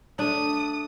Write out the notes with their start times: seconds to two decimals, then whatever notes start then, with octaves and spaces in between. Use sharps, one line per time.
0.19 A3 D4 D#6